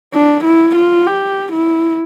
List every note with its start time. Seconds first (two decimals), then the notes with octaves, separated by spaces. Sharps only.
0.14 D4
0.45 E4
0.76 F4
1.06 G4
1.53 E4